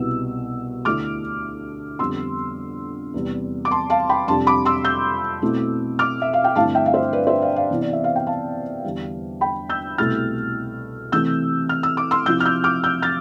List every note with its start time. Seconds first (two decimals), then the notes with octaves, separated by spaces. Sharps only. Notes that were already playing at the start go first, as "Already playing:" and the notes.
Already playing: C2 B2 B3 E4 E6
0.85 D2 D3 A3 E4 D6 F6
1.99 F2 D3 G3 B3 C6 E6
3.14 E2 C3 G3
3.65 D6
3.71 A5 C6
3.90 F5 A5
4.09 G5 B5
4.28 F2 C3 G3 D4 A5 C6
4.47 B5 D6
4.65 C6 E6
4.85 E6 G6
5.42 B2 A3 C4 E4
5.99 D6 F6
6.22 E5
6.33 F5
6.44 G5
6.55 G2 D3 A3 C4 E4 F5 A5
6.75 E5 G5
6.86 F5
6.94 C5 E5
7.13 B4 D5
7.27 C5 E5
7.42 D5 F5
7.56 D5 F5
7.70 C3 E3 B3 E4
7.82 D5
7.93 E5
8.04 F5
8.16 G5
8.27 F5 A5
8.84 E2 D3 G3
9.41 G5 B5
9.69 E6 G6
9.98 C2 B2 A3 E4 F6 A6
11.12 C3 E3 A3 C4 E6 G6
11.69 F6
11.83 E6
11.97 D6
12.11 C6 E6
12.26 C3 F3 C4 E4 E6 G6
12.40 F6
12.45 E6 G6
12.64 D6 F6
12.84 E6 G6
13.02 F6 A6